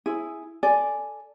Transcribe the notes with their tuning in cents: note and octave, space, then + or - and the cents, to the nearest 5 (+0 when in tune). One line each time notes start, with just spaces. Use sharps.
E4 +0 G#4 +0 C5 +25
A4 +0 D5 +0 G#5 +0